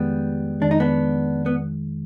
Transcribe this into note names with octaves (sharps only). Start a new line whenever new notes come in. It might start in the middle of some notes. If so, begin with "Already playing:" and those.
Already playing: F2 D#3 G3 G#3 B3
F2 D#3 G#3 D4
D#4
B3 D4
B3